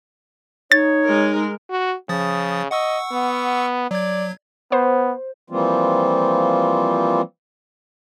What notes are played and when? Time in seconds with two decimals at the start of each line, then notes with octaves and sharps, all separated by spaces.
0.72 D#4 C#5 A6
1.05 G#3 A#4
1.70 F#4
2.09 C#3 F3 D#6 A6
2.71 D#5 F#5 C#6 E6
3.12 B3
3.91 F#3 D5 G#6
4.72 B3 C5
5.50 E3 F3 G3 A#3 C4 F4